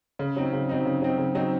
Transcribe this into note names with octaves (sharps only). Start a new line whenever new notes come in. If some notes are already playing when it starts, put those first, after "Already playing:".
C#3
F#3 C4 D#4
C#3
F#3 C4 D#4
C#3
F#3 C4 D#4
C#3
F#3 C4 D#4